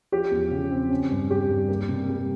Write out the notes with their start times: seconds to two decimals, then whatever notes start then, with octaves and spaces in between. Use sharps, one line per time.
0.12 F3 G4
0.31 E2
0.51 C#3
0.71 C4
0.91 C#4
1.11 G2
1.30 G3 G4
1.49 G2
1.69 A#3
1.89 C3
2.09 G3